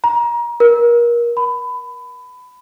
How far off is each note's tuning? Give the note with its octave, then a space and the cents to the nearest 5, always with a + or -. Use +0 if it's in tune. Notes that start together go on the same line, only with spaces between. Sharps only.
A#5 +30
A#4 +30
B5 +20